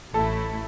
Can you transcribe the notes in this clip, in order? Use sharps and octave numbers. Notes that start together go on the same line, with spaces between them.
A1 A2 A3 E4 A4